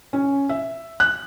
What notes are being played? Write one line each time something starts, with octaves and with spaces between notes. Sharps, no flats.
C#4
E5
F#6